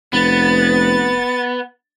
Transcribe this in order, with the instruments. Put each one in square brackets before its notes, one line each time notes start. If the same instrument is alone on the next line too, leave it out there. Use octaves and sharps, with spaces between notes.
[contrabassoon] F1 [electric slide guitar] B3 [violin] A6